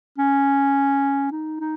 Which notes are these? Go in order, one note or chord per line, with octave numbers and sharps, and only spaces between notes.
C#4
D#4
D#4